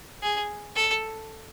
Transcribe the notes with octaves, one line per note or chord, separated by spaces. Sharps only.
G#4
A4